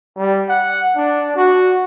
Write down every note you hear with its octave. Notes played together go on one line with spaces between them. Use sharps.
G3
F#5
D4
F#4